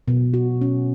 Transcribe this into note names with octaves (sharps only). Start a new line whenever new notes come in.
B2
F#4
C#4